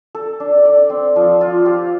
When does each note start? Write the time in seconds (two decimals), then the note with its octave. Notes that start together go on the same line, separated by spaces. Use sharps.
0.15 A4
0.40 D4
0.65 D5
0.90 C4
1.16 F3
1.41 F4
1.66 G4